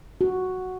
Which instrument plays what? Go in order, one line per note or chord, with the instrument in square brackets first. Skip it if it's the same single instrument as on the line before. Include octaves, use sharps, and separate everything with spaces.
[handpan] F#4